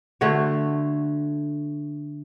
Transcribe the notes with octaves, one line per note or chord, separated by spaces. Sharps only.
D3 A3 F#4 C#5